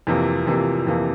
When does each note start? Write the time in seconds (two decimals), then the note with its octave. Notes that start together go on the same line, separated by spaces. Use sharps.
0.07 F2 C3 E3 A#3
0.47 F2 C3 E3 A#3
0.87 F2 C3 E3 A#3